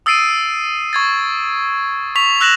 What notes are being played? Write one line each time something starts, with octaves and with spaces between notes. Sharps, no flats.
D#6 E6 A6 C7 D7 D#7
C#6 G#6 A6
C#6 B6 F7
E6 F#6 A#6 E7 F#7